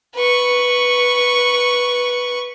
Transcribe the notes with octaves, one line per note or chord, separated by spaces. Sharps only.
B4 C#6